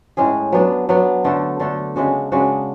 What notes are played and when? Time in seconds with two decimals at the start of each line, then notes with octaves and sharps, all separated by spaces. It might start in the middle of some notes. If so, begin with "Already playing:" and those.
0.17 A2 G#3 C#4 G#4
0.52 F#3 B3 D4
0.89 F#3 B3 D4
1.24 D3 A3 D4 A4
1.60 D3 A3 D4 A4
1.96 C#3 G#3 D4 F#4
2.32 C#3 G#3 D4 F#4